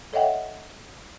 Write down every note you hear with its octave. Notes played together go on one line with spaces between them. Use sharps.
A4 C#5 D#5 E5 F#5 G5